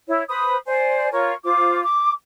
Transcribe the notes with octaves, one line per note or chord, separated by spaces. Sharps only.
E4 C#5
B4 C5 B5 D#6
C5 D5 G#5
F4 A#4 C#5 C#6
F4 C5 D6
D6